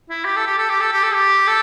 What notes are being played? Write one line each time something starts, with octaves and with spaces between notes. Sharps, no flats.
E4
G4
A4
G4
A4
G4
A4
G4
A4
G4
A4